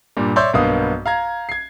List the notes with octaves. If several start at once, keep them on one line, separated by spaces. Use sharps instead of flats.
G2 A#2 G3
C#5 D5 E5 C6 E6 G6
B1 G2 A#3 B3 F5 D#6
F5 A#5 G#6
G#6 C7